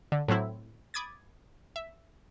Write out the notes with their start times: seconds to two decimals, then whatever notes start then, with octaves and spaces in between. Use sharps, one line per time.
0.12 D3
0.28 A2 F#3 C4 E4
0.94 B5 D6 D#6 G#6 A6
1.76 E5